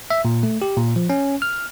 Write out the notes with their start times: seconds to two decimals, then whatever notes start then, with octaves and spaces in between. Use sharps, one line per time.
0.11 E5
0.25 A#2
0.43 A3
0.62 G4
0.77 A#2
0.96 F3
1.10 C#4
1.42 F6